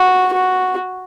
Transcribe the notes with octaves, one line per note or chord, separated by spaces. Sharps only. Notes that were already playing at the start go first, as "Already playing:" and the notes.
Already playing: F#4
F#4